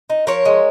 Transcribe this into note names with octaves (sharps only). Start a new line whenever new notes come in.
D#4
F3 A#4 C#5
G#3